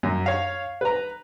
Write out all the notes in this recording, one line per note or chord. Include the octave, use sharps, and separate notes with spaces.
F#2
C#5 F5
B4 A#5